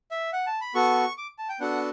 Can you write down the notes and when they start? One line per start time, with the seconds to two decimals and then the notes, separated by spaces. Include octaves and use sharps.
0.11 E5
0.33 F#5
0.47 A5
0.61 B5
0.75 B3 F#4 A4 C#6
1.18 D6
1.38 A5
1.49 G5
1.60 B3 D4 F#4 A4 F#5